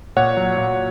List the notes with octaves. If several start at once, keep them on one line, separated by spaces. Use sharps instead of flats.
A#2 C#5 F#5
F#3
A#2